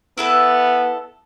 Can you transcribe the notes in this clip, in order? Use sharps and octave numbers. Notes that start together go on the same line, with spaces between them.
B3 E4 A4 B4